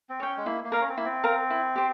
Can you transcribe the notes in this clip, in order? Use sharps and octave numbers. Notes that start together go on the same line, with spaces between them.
C4
C#4 C#5 G5
G#3
A#3 E4
A#3
A#4 F5 A#5
C#4
C4
A#3 E4
C4
A#4 F5 A#5
E4
G4 C5